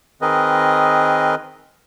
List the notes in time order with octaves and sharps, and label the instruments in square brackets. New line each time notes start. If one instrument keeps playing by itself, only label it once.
[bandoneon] D#3 C4 G#4 A#4 B4 D#5